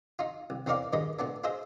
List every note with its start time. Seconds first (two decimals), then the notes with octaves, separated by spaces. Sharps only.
0.19 D#4 F4
0.50 C2
0.66 E2 C4 D#4 A#4 D5 F5
0.93 G2 A#2 D#3 G#3 D#5 B5
1.19 A#2 A3 B3 D4
1.44 F4 G#4 C5 D#5 E5